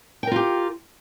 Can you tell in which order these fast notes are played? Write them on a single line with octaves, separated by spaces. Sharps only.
G5 A#4 F4 G4